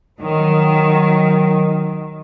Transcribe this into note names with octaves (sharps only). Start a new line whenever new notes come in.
D#3 F#3